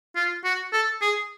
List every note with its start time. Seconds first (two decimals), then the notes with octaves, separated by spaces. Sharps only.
0.16 F4
0.44 F#4
0.73 A4
1.01 G#4